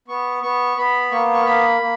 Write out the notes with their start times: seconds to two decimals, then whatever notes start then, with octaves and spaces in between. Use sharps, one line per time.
0.08 B3 C#6
0.42 B3 C#6
0.77 B3 B5
1.11 A#3 C#6
1.33 C#6
1.45 A#3 B5
1.81 A#3